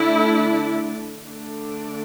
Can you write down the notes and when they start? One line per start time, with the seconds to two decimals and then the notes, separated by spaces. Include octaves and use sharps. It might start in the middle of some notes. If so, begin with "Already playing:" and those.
Already playing: D3 A3 D4 E4
1.25 D3 A3 D4